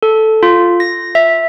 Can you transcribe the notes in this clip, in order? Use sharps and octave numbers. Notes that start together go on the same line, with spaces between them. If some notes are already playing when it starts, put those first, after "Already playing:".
A4
F4
A#6
E5